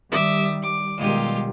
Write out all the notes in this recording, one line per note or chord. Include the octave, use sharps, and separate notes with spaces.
D#3 G3 E5 D6 D#6
D6
B2 D#3 G3 G#3 F4 G4